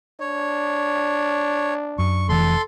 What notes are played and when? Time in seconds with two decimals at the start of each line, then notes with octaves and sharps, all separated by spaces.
0.20 D4 C#5
1.98 F#2 C#6
2.29 F1 E3 A4 C6